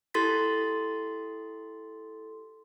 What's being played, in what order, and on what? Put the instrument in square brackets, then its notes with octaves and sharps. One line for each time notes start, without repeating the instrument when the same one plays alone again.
[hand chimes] E4 G4 A4 C6 A6 B6